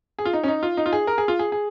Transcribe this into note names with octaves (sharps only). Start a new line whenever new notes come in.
G#4
F4
D#4
C#4
D#4
F4
D#4
F4
G#4
A#4
G#4
F4
G#4
G#4